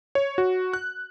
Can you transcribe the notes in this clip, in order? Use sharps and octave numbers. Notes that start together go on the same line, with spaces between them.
C#5
F#4
F#6